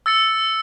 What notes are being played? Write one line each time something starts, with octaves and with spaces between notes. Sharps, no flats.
E6 A6 C#7